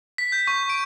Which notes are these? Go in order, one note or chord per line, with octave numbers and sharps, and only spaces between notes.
B6
G6
C#6
D7